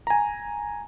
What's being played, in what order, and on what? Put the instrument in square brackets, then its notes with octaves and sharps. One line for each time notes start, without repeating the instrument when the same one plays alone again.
[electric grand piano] G#5 A#5